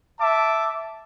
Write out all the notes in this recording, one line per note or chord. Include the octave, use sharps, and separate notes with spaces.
E5 A5 D6